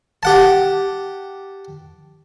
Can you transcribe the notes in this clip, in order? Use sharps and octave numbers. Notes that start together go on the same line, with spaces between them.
G4 F#5 A5